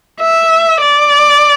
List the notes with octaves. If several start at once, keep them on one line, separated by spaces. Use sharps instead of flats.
E5
D5